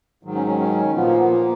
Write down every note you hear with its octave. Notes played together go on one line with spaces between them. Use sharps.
G#2 D#3 F#3
C#4
C#4
C#4
A#2 F3 B3
A#3
B3
A#3